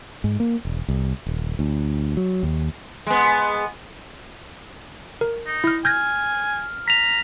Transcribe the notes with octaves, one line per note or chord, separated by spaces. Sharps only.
G#2
A#3
E1
C2
D#1
D2
F#3
D#2
G#3 B3
A#4
D#4
E4 F6
G#5 F6 G6 G#6 A#6
A#5 B6 F7